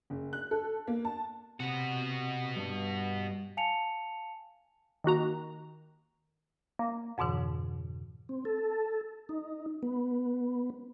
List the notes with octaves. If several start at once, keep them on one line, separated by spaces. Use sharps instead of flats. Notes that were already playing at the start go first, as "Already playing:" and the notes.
F#1
F#6
A4
A#3
A5
C3 B3 F#4
G2 G3
F5 G#5 A5 C#7 F7
D#3 A#3 F#4 A#5
A#3
F2 G#2 B2 D3 E3
C4
A4
D#4
B3